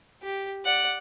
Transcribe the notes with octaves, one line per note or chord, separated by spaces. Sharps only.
G4
D5 F#5